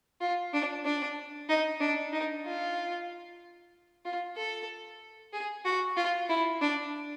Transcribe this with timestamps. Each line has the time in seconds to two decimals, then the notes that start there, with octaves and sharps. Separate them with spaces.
0.21 F4
0.53 D4
0.85 D4
1.49 D#4
1.80 D4
2.13 D#4
2.45 F4
4.05 F4
4.36 A4
5.33 G#4
5.65 F#4
5.97 F4
6.29 E4
6.61 D4